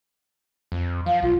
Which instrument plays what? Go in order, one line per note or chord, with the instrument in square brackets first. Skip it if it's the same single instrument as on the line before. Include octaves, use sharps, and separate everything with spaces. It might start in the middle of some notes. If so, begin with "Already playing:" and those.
[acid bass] F2
[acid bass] F3 [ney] F5
[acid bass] B1 [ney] F4